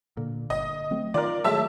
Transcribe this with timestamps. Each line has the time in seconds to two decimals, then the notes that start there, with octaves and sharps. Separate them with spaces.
0.17 A#2 D3
0.50 G1 D#5
0.91 F#3 A3 C4
1.14 D#3 F4 A#4 D5
1.44 F#3 G#3 A3 E5 A5 E6